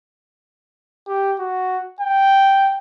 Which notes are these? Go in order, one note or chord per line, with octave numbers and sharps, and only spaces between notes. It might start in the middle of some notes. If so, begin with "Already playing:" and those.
G4
F#4
G5